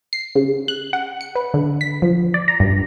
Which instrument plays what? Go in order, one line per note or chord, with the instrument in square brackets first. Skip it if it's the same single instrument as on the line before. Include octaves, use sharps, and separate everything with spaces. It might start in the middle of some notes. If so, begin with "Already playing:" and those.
[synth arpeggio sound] C7
C#3
F#6
F#5
C#7
B4
D3
B6
F3
D5
A#5
G2